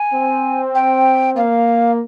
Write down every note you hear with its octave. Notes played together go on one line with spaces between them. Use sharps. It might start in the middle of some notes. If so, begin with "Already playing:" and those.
Already playing: G#5
C4
G5
A#3 F5